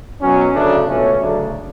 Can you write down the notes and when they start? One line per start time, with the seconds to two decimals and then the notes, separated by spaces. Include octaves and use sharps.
0.21 B2 F#3 C#4
0.54 D2 C#3 F#3 A3 D4
0.86 C#2 B2 A3 C#4
1.18 D2 C#3 F#3 A3 D4